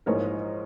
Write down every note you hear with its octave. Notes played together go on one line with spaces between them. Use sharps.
A#1 G#2 E3 A#4 C#5